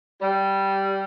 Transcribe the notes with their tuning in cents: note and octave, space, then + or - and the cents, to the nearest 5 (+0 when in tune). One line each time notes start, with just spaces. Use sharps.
G3 -10